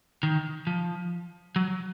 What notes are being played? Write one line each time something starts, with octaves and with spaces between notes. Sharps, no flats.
D#3
F3
F#3